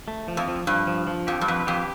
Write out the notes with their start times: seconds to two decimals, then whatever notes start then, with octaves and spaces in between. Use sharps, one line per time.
0.08 A3
0.28 F3
0.37 F2
0.48 F3
0.67 G2 F3
0.87 F3
1.07 F3
1.27 F2 G4
1.41 G2
1.48 F2 B4
1.67 F2 G4